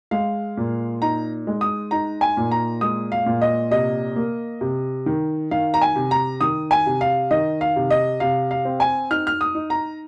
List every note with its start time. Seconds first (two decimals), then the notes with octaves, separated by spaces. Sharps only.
0.11 G#3 F5
0.57 A#2
1.02 D#4 A#5
1.47 G#3
1.61 D#6
1.91 D#4 A#5
2.21 G#5
2.37 A#2
2.51 A#5
2.81 G#3 D#6
3.12 F5
3.26 A#2
3.42 D#5
3.71 C3 D#5
4.16 A#3
4.61 C3
5.06 D#3
5.51 D#3 F5
5.74 A#5
5.81 G#5
5.96 C3
6.11 A#5
6.41 D#3 D#6
6.71 G#5
6.86 C3
7.01 F5
7.31 D#3 D#5
7.61 F5
7.76 C3
7.90 D#5
8.20 C3 F5
8.51 F5
8.65 C4
8.80 G#5
9.10 D#4 F6
9.27 F6
9.41 D#6
9.55 D#4
9.70 A#5